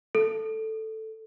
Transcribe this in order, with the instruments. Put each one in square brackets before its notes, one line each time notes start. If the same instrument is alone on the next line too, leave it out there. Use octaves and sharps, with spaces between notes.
[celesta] A4